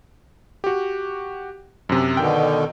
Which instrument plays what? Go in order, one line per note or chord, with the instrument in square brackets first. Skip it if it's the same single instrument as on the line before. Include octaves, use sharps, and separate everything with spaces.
[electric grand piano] F#4 G4
F#2 C3
[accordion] B2 D3 D#3 [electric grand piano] G5